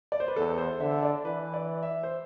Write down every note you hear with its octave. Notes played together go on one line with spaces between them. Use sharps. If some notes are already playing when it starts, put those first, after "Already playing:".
D5
C5
B4
E2 A4
C5
D3 E5
D5
E3 B4
D5
E5
C5